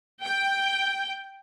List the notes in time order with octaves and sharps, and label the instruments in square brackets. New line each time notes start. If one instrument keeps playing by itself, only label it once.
[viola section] G5